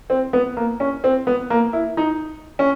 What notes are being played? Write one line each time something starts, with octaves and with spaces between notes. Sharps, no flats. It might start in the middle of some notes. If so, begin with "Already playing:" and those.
C4
B3
A#3
C#4
C4
B3
A#3
E4
D#4
C#4